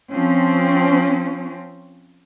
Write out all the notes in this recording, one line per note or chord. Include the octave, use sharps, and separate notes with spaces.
F3 C4 C#4